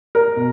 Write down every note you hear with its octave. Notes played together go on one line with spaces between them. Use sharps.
A#4
B2